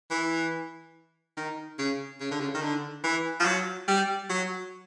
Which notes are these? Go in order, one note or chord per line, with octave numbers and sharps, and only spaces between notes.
E3
D#3
C#3
C#3
D3
C#3
D#3
D3
E3
F3
F#3
G3
F#3